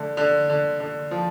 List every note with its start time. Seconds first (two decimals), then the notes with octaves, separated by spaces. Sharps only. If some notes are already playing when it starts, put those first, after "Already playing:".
Already playing: D3 A3
0.17 D3
0.49 D3
0.80 D3
1.11 F3